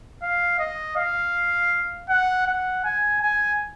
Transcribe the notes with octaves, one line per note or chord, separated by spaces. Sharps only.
F5
D#5
F5
F#5
F#5
G#5
G#5